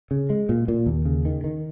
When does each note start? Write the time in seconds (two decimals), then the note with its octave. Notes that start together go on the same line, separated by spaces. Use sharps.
0.11 C#3
0.30 G#3
0.49 A#2
0.68 A#2
0.86 D#2
1.05 C#3
1.25 D#3
1.44 D#3